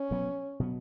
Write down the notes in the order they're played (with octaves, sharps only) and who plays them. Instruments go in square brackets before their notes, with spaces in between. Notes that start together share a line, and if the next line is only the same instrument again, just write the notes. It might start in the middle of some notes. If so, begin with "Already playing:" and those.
Already playing: [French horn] C#4
[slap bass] B2 F#3 B3
B2 F#3 B3